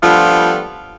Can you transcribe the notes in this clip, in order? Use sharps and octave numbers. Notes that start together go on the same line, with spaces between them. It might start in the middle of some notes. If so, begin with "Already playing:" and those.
F3 G3 A3 B3 D4 F4